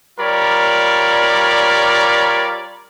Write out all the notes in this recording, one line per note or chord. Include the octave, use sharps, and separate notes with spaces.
G3 F4 A#4 C#5 D5 B5